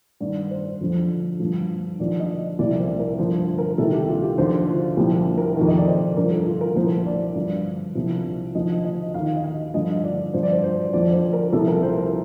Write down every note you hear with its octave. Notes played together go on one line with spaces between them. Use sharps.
G2 D#3 D5
C5
F2 D3 F3
G2 D3 F3
D#2 D3 F3 D5
D#5
C2 C3 F3 D5
C5
A#4
G2 D3 F3 C5
A#4
C2 C3 D#3 A4
G4
F4
G4
D#2 D3 F3 C5
F4
C2 A#2 F3 G4
A#4
F2 C3 D#3 A#4
D#5
D5
C5
G2 D3 F3 A#4
A4
F4
A#4
C2 A#2 F3 C5
D5
G2 D3 F3
C2 C3 F3
D#2 D3 F3 D#5
D#5
D#2 D#3 F5
D#5
F5
G2 D3 F3 D#5
D5
G2 F3 C5
D5
C5
C5
F2 D3 F3 D5
C5
A#4
C2 C3 F3 A4
A#4
C5
A#4